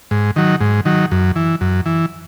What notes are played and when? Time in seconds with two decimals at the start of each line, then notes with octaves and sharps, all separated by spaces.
0.11 G#2
0.36 D#3 F#3
0.61 G#2
0.85 D#3 F#3
1.11 F#2
1.36 E3
1.61 F#2
1.86 E3